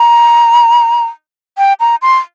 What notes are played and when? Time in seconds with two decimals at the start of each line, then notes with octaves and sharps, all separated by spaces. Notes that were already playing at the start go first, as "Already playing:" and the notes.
Already playing: A#5
1.58 G5
1.80 A#5
2.02 C6